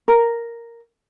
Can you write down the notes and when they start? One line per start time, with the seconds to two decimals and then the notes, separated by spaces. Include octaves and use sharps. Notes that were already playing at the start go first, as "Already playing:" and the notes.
0.08 A#4